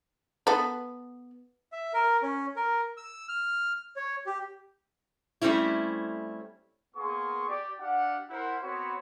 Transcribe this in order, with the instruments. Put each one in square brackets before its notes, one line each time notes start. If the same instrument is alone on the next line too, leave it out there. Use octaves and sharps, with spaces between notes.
[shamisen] B3 A4
[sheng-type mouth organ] E5
A#4
C#4
A#4
E6
F6
C#5
G4
[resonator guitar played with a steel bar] G3 A3 C4 C#4 E4
[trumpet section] A#3 B3 G#4 C6 C#6 D#6
G4 D5
D4 G4 F5 F#5
E4 A#4 C5 F#5
B3 C4 F#4 C#5 B5